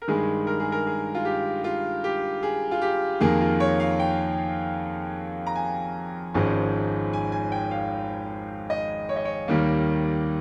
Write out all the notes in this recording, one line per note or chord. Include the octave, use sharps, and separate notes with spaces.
A#4
G2 D#3 G#3 G#4
A#4
G#4
A#4
G#4
F4
G4
F4
G4
G#4
F4
G4
F2 D#3 A#3 G#4
F4
C#5
F5
G5
A#5
G#5
G#1 G#2 F3 G#3 C#4
G#5
G#5
G5
F5
D#5
C#5
D#5
C#5
D#2 D#3 G3 A#3